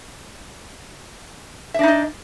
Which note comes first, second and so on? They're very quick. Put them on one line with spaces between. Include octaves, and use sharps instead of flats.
E5 D4 D#4 D#5